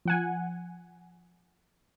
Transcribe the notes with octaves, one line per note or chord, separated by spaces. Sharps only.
F3 F#5 G#5